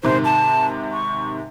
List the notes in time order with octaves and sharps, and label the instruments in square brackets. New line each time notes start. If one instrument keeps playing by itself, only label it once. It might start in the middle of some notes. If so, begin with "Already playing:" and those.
[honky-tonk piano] G#2 C3 D#3 [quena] C5
[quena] A5
C#6